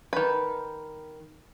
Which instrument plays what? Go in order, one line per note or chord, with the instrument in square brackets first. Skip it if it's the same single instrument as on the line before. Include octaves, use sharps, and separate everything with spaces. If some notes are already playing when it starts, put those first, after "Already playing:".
[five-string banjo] D#3 B4